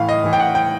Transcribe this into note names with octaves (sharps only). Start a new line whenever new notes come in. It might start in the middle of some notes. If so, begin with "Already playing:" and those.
Already playing: A2 E3 F5
D#5
A2 E3
G5
F#5
G5